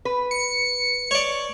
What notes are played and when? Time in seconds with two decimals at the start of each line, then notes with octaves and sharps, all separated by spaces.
0.05 B4
0.31 C#7
1.11 C#5 D5